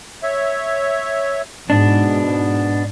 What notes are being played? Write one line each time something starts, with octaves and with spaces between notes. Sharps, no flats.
C#5 E5
G#2 B2 B3 D4